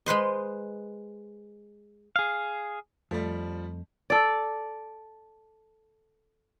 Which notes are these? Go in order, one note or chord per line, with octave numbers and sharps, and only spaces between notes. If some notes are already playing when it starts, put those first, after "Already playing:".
G#3 B4 C5 D#5
G#4 F5
F2 F3 G3 A3
A4 D5